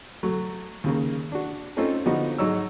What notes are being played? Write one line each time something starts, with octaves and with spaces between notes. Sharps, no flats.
F#3 A3
D#2 C#3 A#3
D4 F#4
A3 C4 C#4 D#4 F4 A4
D3 F3 B3 D#4 F#4
G#2 F#3 D#4 C#5 E6